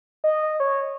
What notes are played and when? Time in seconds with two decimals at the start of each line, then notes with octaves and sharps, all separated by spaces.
0.24 D#5
0.60 C#5